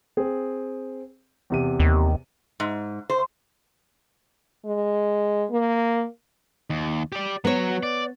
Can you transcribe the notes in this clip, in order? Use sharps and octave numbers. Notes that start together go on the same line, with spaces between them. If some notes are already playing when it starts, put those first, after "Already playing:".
C4 G#4
E2 C3 D#7
D#2
G#2
C5
G#3
A#3
D#2
G4 D5
F#3 B3 F#4 C#5
D5